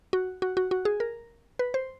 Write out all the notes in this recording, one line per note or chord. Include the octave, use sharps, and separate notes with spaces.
F#4
F#4
F#4
F#4
G#4
A#4
B4
C5